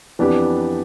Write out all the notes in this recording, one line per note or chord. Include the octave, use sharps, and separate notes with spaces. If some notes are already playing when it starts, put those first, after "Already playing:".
F2 E3 B3 D4 G4